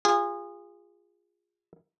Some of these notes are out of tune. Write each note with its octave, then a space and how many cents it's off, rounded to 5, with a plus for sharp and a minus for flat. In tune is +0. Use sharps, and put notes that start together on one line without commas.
F4 +0 G#4 -25